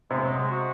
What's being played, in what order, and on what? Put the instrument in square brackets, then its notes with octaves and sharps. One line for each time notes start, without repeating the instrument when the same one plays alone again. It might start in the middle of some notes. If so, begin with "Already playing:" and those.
[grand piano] C3 [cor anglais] G#3
[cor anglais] F#3
G#3
F#4